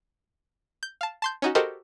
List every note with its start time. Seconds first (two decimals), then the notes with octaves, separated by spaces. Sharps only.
0.83 G6
1.01 F5 A5
1.22 A5 C6 G6
1.42 C#4 D#4 F#4
1.55 F#4 G4 A4 A#4 C5 D#5